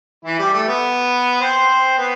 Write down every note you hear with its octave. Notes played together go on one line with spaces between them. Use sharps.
E3 E4
G3 G4
A3 A4
B3 B4
C4 C5
B3 B4